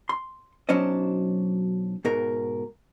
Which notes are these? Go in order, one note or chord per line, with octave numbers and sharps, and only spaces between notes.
C6
B1 F#3 C#4 D4 C5 D#5
G#2 B2 A#4